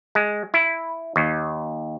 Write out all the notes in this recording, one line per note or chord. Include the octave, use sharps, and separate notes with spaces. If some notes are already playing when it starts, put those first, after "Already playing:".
G#3
E4
D#2